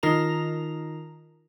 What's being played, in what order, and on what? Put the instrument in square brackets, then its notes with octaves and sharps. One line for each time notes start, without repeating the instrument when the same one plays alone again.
[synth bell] D#3 D#4 F4 A#4 A#5 F7